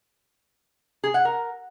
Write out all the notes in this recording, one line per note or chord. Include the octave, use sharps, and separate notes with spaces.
G#4
F#5
A#4